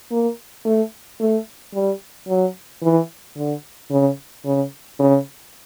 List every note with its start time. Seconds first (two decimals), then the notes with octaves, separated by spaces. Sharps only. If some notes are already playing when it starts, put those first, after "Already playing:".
0.11 A#3
0.65 A3
1.20 A3
1.74 G3
2.28 F#3
2.82 E3
3.37 D3
3.91 C#3
4.45 C#3
4.99 C#3